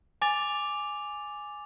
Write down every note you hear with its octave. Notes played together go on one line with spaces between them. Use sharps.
G#5 D6 A6 F7